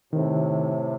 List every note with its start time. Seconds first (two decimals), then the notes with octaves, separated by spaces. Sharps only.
0.13 A2 C3 D#3